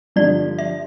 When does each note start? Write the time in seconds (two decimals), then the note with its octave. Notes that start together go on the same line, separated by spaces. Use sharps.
0.16 G2 D3 F3 D5
0.59 E5